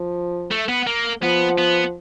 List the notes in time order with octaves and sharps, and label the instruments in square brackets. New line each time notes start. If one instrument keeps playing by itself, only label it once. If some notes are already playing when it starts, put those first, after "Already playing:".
Already playing: [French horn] F3
[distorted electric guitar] A3
B3
A#3
[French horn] F3 [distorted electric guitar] B3
[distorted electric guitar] B3